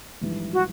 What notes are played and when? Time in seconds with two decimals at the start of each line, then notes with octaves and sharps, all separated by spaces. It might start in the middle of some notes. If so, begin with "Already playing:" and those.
0.21 A#1 G#2 E3 G3
0.52 F#4